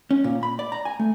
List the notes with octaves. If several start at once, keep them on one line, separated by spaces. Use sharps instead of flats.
C#4
A#2
B5
D5
A#5
G#5
A3